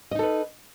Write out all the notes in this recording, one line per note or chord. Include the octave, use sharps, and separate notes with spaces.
D#4 A4 B4 D#5